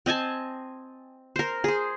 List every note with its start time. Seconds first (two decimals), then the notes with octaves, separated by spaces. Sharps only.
0.06 C4 D#5 G#5 A5
1.36 A#4 C5
1.64 G#4 C5